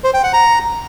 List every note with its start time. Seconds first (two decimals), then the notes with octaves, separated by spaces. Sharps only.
0.04 C5
0.14 G5
0.23 F#5
0.33 A#5